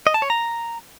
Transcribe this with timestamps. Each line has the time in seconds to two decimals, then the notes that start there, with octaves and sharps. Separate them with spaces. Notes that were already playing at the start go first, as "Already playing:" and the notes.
0.07 D#5
0.14 A5
0.22 C#5
0.30 A#5